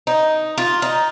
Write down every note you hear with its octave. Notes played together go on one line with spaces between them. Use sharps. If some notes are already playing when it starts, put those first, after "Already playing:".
D#4
F4
D#4